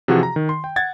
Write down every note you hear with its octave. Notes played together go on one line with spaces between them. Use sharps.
C3 E3 F3 F#4 G#4 F#5
A#5
D#3
C6
G5
F#5 G#6 A6